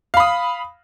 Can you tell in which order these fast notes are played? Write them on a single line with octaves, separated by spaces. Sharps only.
F5 B5 D#6